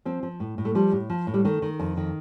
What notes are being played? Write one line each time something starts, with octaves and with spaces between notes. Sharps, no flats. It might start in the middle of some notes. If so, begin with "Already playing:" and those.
F3 C4
F3
A2
A2
A3
F3 G3
A2
F3
A2
G3
D#3 A3
D#3
F2
D#3